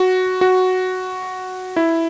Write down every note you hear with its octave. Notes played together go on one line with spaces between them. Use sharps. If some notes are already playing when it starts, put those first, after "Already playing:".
Already playing: F#4
F#4
E4